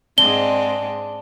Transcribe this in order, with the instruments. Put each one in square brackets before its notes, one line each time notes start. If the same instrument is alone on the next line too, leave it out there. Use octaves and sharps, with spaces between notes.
[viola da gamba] G#2 G#3 C4 [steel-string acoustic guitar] D4 [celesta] G7